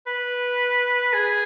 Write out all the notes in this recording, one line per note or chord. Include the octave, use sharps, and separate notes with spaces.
B4
G#4